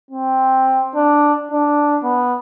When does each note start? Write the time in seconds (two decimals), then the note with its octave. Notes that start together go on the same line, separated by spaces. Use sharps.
0.11 C4
0.95 D4
1.52 D4
2.04 B3